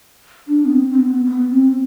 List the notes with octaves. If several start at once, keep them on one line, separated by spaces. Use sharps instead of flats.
D4
B3
C4
C4
B3
B3
C4